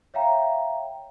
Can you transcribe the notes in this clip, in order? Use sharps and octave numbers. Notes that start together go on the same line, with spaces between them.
C#5 E5 F5 G5 A#5